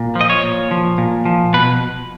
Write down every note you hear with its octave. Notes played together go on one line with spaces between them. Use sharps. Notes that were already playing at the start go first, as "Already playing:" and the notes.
Already playing: A#2
F3
D#5
C#5
A#2
F3
A#2
F3
B2 B4